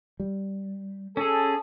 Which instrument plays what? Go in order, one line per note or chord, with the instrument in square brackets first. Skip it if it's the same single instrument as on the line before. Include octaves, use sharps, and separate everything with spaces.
[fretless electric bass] G3
[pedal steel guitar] C#4 G#4 [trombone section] A4